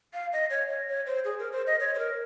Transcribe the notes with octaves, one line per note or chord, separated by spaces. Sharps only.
F5
D#5
C#5
C#5
C#5
C5
G#4
A#4
C5
D#5
C#5
C5
A#4